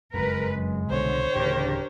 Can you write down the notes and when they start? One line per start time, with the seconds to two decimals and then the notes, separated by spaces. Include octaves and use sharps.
0.14 F#1 F2 G#3 A#4 B4
0.53 F#2
0.90 C2 B2 D3 D#3 C5 C#5
1.35 D1 D2 C#3 E3 D4 G4 A#4